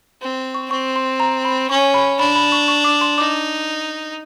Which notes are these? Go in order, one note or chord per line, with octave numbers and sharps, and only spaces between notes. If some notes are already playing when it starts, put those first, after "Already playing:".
C4
C#6
C4 C#6
C6
A#5
B5
C#4 C#6
B5
D4 B5
B5
C#6
C#6
D6
C6
D#4 D6